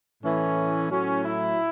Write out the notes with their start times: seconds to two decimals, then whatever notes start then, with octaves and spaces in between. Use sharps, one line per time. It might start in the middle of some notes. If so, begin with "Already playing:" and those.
0.23 A2 E3 C#4
0.90 A2 F#3 C#4
1.24 E4